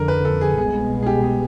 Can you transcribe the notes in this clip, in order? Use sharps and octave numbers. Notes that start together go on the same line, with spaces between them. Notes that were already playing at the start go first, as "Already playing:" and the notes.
Already playing: F2 D3 F3 A#4
B4
A4
G#4
C2 B2 G#3 B3 G#4
G#4
G4
G#4